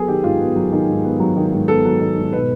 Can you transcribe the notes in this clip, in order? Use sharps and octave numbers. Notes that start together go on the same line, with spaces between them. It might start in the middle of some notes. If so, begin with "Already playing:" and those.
Already playing: F#3 B3 G#4 A4
D#3 G4
G#2 F4
B3
F#3
D#3
G#2
B3
F#3
D#3
G#2
B3 A4
F#3
D#3
G#2
B2 B4